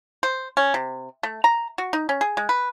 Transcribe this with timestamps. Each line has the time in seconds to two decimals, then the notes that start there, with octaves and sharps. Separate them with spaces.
0.23 C5
0.57 C#4
0.74 C3
1.23 A3
1.44 A#5
1.78 F#4
1.93 D#4
2.09 C#4
2.21 G#4
2.37 G#3
2.49 B4